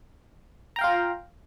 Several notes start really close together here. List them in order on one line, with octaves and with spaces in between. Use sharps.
A#5 G5 F5 F4